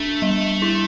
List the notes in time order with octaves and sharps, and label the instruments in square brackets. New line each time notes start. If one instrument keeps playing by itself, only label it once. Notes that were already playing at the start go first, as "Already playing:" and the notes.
Already playing: [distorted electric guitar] A3 [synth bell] D4
[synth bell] G3
E4